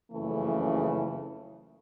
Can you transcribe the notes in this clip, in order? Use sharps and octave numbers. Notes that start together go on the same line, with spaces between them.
F#1 F2 C#3 E3 A3